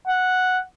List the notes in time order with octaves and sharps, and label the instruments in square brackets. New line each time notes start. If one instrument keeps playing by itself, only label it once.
[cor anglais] F#5